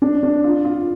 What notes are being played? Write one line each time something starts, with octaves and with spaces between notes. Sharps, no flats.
D4
D4
F4
F4